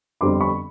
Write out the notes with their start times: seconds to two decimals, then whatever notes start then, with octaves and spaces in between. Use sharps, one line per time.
0.21 G1 F2 D3 G3 C4 C6 D6
0.41 B5 C#6